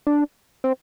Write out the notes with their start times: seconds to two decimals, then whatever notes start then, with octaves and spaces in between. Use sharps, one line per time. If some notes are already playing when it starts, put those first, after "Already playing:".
0.07 D4
0.64 C4